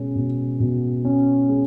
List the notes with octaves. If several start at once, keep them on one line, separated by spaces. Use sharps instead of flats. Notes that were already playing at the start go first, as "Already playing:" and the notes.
Already playing: B2 G#3 C#4
B2
B2
C#4
G#3